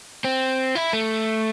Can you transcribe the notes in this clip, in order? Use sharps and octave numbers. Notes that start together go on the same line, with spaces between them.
C4
E4
A3